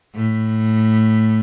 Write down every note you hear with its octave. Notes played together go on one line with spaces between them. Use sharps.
A2